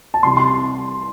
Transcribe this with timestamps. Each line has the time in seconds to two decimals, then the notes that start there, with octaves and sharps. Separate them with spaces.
0.14 A5
0.23 C2 C3 G3 C6
0.37 C6